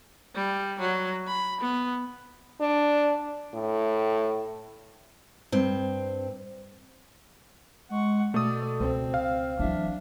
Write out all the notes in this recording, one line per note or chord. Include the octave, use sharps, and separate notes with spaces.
G3
F#3
B5
B3
D4
A2
G2 C4
G#3 F#5 C#6
B2 A3 A4 D5 D#6
C#2 C4
F5
E3 F#3 D4 E5